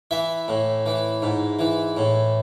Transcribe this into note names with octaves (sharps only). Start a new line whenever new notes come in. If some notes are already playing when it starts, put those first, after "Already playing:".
E3 E5
A2
E3
G#2
E3
A2